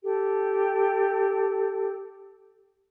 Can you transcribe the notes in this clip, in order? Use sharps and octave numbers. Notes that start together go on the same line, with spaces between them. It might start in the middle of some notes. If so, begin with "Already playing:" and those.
G4 A4